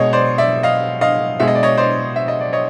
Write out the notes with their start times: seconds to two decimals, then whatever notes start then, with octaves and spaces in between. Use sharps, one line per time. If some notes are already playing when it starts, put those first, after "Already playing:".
Already playing: B2 G#3 C#5 D#5
0.13 C5 D5
0.38 D5 E5
0.63 D#5 F5
1.01 D#5 F5
1.40 B2 G#3 E5
1.48 D#5
1.55 D5
1.63 C#5 D#5
1.78 C5 D5
2.16 E5
2.28 D#5
2.41 D5
2.53 C#5 D#5